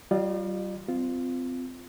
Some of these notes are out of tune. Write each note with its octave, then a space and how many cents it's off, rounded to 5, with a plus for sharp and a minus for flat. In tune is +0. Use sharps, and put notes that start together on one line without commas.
G3 -35 F4 +0 D5 +45
C4 -25 F4 +0